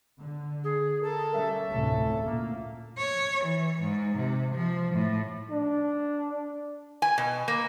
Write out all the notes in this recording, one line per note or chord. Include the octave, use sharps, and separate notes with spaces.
D3
G#4
A4 A#4
G3 C#4 E5
F1 D2 A2 A4
A#2 A#3
C#5
E3
G#2
C3
F3
A2
D4
G#5
B2
A#3